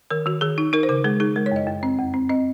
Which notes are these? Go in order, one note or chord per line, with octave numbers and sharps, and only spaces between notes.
D#3 A#4
D#3 F#4
D#3 G#4
D#4
D#4 A#4
C5
C#3 A#4
G#3 G#4
D#4 G#4
G#3 A#4
C#5
F#2 D#5
F#2
C4
F2
C4
C4 D#5